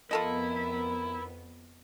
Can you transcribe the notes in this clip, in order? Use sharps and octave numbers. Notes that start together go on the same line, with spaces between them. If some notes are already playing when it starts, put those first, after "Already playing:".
F2 B3 E4 F4 A4 A#4 D#5